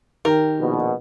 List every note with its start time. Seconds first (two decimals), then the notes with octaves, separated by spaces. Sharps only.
0.25 D#3 G4 A#4
0.60 A#1 B2